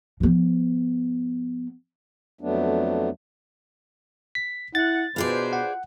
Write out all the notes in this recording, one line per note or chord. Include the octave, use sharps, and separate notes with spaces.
F3 B3
F2 F#3 A3 B3 D4
B6
E4 F#5 A6
B2 D4 F4 G#4 B4 C5 D5
F#5